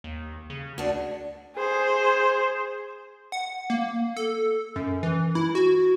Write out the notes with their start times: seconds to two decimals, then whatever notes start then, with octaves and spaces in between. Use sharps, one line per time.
0.04 D#2
0.50 C#3
0.78 D2 D4 F#4
1.56 G#4 C5
3.32 F#5
3.70 A#3
4.17 A4
4.76 F#2
5.03 E3
5.35 E4
5.55 F#4